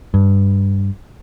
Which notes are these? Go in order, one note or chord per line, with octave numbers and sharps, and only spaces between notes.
G2